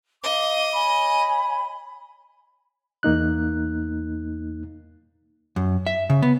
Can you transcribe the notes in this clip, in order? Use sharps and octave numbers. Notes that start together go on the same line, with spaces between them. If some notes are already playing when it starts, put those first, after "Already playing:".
D#5 F5 D6
C#5 G#5 B5
E2 A#3 D#4 F#6
F#2
E5
C#3
B3